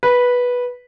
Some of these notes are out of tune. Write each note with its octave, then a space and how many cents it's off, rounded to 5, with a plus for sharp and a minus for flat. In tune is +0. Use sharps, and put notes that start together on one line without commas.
B4 -10